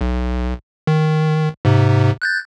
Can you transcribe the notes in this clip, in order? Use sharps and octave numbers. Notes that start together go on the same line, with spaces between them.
B1
D#3
G#2 C3
F#6 G6 A6